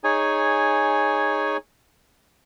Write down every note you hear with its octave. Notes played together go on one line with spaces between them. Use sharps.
D#4 G#4 C#5 G#5